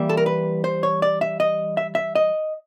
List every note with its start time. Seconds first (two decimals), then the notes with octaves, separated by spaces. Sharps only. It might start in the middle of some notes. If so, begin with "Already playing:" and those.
Already playing: E3 G3 A#3 E5
0.09 A4
0.17 A#4
0.26 B4
0.64 C5
0.83 C#5
1.02 D5
1.21 E5
1.40 D#5
1.77 E5
1.95 E5
2.15 D#5